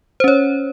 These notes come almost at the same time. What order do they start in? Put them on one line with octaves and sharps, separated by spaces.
C5 C#4 C#5